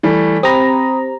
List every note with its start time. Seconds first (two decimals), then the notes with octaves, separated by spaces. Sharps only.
0.03 E3 G3 A3
0.43 C4 G4 A#5 B5 D#6